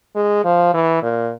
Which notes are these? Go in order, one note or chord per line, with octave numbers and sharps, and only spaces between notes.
G#3
F3
E3
A#2